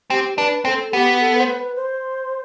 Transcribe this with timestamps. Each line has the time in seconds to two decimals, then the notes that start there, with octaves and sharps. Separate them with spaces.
0.10 C4 G4
0.37 D4 B4
0.65 C4 A4
0.93 B3 G4
1.20 A4
1.37 C5
1.47 B4
1.76 C5